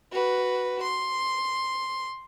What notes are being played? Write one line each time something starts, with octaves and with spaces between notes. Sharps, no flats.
F#4 B4
C6